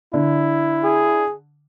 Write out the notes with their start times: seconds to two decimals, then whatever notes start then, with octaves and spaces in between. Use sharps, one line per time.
0.14 D3 E4
0.84 G#4